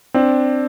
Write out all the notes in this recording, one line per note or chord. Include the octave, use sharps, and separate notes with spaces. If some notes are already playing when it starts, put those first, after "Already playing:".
C4 D4